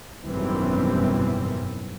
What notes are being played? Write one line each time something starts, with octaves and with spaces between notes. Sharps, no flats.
G#1 F#2 B2 E3 G3 C4